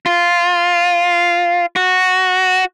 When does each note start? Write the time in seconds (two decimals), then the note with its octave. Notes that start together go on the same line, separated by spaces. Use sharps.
0.06 F4
1.76 F#4